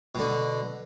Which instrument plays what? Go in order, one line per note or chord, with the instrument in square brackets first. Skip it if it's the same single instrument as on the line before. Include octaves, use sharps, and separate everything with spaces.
[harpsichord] B2 D3